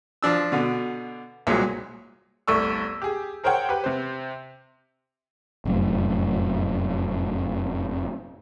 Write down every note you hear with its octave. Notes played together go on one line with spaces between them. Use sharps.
F3 D4 E6
B2 D3
C2 A#2 F#3 G#3
G1 C2 A3 D5 C#6 E6
G4 G#4
G#4 A#4 C5 C#5 F#5 G5
G4 B4
C3 C5
F1 F#2 A2